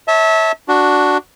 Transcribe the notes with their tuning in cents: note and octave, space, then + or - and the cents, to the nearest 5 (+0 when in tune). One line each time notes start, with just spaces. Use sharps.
C#5 +0 E5 -25 A5 +0
D4 +0 F#4 +0